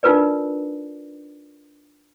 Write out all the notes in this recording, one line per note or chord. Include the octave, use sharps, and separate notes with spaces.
D4 D#4 F4 A#4 B4 D5